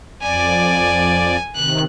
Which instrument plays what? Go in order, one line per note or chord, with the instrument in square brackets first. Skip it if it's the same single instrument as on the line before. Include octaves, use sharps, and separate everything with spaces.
[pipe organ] F2 D5 [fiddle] G#5
[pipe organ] C3 D#3 [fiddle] F#6